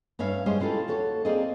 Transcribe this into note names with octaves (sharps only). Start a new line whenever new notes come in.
G2 C#4 C#5 E5 F5
G3 G#3 C#4 C5 C#5 D#5
G#3 E4 F4 G4 A4
D#2 F#4 A4 C#5
A#3 C4 G#4 D5 D#5